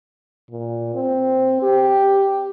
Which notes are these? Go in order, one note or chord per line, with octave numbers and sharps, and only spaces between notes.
A#2
C4
G4